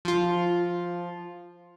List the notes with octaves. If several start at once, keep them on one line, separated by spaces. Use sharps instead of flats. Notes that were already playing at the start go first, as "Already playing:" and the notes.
F3 F4